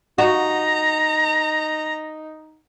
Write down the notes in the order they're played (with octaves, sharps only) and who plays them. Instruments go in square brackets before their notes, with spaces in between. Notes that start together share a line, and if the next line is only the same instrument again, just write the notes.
[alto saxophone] D#4 [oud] F#4 [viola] A#5